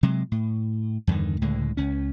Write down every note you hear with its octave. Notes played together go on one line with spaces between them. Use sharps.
C3 F#3 G#3
A2
E2 G2 D3 D#3
C#2 A2 D3 G#3
C#2 C#4